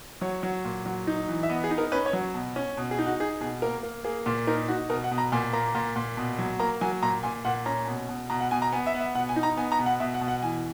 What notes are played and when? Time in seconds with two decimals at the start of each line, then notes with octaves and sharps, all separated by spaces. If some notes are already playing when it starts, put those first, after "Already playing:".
0.21 F#3 C#5
0.43 F#3
0.65 A#2
0.86 F#3
1.07 D#4
1.28 E3
1.43 E5
1.49 B3 D#5
1.64 G#4
1.71 D#4
1.78 A#4
1.92 C#4 B4
2.06 C#5
2.13 F#3
2.34 B2
2.56 C#4
2.77 B2
2.91 G#4
2.99 D#4
3.06 F#4
3.20 D#4 G#4
3.41 B2 G#4
3.62 A#3 A#4
3.83 A#3
4.04 A#3 G#4
4.26 A#2
4.47 D#4 A#4
4.68 D#4 F#4
4.89 B2 A#4
5.04 F#5
5.11 B2
5.18 A#5
5.32 A#2 G#5
5.53 A#3 A#5
5.75 A#2
5.96 A#2
6.17 B2
6.38 F#3
6.60 A#3 A#5
6.81 F#3 G#5
7.02 A#2 A#5
7.23 A#2 G#5
7.45 A#2 F#5
7.66 C#4 A#5
7.87 B2
8.09 B2
8.30 B2 A#5
8.41 F#5
8.51 B2 G#5
8.62 A#5
8.72 B3 G#5
8.86 E5
8.94 B3 F#5
9.00 E5
9.15 B2 F#5
9.29 G#5
9.36 D#4
9.43 A#5
9.57 B3 G#5
9.72 A#5
9.79 B2
9.86 F#5
10.00 B2 E5
10.14 F#5
10.21 B2
10.28 F#5
10.42 E3 G#5